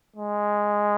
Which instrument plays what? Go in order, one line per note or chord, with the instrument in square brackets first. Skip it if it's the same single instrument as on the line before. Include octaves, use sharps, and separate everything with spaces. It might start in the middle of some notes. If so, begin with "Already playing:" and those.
[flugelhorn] G#3